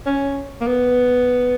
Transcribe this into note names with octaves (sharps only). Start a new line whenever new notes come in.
C#4
A#3
B3